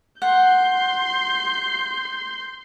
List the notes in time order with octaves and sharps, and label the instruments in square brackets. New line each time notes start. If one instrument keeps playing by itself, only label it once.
[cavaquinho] F#5 [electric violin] C6 G6